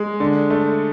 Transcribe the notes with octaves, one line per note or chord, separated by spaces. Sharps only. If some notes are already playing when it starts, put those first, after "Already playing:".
Already playing: G#3
D3
A3